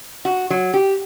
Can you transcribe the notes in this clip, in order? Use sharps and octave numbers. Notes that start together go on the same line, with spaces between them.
F#4
F#3
G4